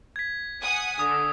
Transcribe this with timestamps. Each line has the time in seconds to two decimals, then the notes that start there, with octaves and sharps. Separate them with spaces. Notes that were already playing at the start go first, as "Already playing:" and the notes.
0.16 G#6 B6
0.63 F#5 G#5 D#6
0.99 D3 D#6